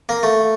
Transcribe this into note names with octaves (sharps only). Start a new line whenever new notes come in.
A#3
A3